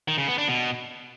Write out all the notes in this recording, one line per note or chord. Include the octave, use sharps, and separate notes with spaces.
D#3
C#3
B3
D4
B2